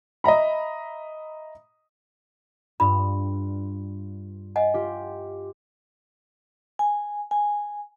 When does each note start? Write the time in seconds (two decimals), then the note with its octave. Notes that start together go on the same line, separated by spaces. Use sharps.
0.24 D#5 E5 A#5 B5
2.80 G2 F4 B5
4.56 D#5 F#5 G#5
4.74 F4 G4
6.79 G#5
7.31 G#5